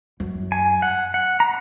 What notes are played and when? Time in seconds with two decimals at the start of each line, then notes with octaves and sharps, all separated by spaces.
0.20 F#2
0.52 G#5
0.82 F#5
1.14 F#5
1.40 A#5